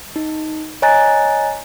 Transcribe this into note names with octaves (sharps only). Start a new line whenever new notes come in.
D#4
C#5 D#5 G#5 A#5 F#6 A6